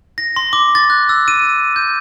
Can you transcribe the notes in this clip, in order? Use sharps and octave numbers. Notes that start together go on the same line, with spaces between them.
A#6
C6
D6
A6
F#6
E6
D#7
G6